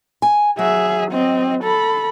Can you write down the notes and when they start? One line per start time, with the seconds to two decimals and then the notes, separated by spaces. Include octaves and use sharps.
0.22 G#5
0.59 F#3 G#4 E5
1.12 C4 D#5
1.64 A4 B5